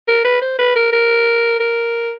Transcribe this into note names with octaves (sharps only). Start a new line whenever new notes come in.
A#4
B4
C5
B4
A#4
A#4
A#4